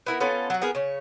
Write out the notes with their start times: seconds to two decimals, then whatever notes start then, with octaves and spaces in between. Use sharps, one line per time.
0.06 B3 E4 A#4
0.20 B3 C#4 F4 A4
0.50 F#3 F#4
0.62 B3 G#4 A#4
0.75 C#3 C#5